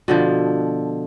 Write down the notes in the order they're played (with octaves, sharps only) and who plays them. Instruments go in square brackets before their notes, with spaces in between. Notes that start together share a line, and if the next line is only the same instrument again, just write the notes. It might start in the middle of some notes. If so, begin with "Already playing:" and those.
[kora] B2 D3 F3